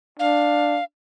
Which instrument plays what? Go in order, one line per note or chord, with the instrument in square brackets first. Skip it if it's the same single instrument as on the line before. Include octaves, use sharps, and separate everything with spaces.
[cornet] D4 [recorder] F5